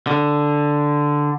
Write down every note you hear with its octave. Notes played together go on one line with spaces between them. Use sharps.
D3